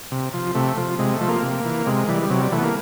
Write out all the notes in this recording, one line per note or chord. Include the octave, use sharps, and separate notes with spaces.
C3
F3
C3 A3
F3
C3 G#3
A3
F3
A#3
C3
E3
C3 G#3
E3 G3
G3
C3 F#3
G3
E3 A3
B3
A#3